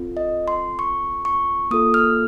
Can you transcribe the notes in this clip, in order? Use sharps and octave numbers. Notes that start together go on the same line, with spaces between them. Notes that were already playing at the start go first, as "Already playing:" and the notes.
Already playing: C4 F4 A4
D#5
C6
C#6
C#6
A#3 F4 A4 D#6
F6